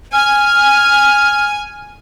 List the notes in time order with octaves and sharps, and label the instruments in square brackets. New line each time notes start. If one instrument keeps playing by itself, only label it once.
[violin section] G#5 [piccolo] F6